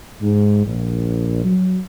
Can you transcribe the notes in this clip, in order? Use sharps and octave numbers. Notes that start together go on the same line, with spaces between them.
G#2
A#1
F#3